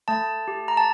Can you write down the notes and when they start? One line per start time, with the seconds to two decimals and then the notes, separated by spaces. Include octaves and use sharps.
0.08 A3 A5
0.48 G4
0.68 A#5
0.77 A5